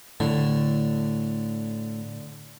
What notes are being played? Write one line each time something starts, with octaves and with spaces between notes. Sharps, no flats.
A2 D3